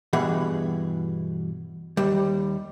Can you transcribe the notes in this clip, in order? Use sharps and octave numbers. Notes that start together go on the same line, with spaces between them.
G2 B2 E3 G#4 F#5 B5
D#2 G3